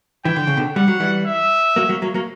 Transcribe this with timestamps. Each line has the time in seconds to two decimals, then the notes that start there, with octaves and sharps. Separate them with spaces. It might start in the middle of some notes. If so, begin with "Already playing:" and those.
0.25 E3 G5
0.36 D3
0.47 C#3
0.57 B2 D3
0.75 G3 F#5
0.88 F#3
1.00 E3 G3
1.26 E5
1.76 F#3 A#3
1.89 F#3 A#3
2.02 F#3 A#3
2.14 F#3 A#3